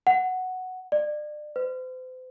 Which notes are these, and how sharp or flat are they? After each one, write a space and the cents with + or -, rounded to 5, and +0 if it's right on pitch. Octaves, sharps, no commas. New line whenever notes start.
F#5 +0
D5 +35
C5 -40